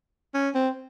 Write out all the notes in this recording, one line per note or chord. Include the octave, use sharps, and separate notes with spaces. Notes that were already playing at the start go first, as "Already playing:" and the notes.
C#4
C4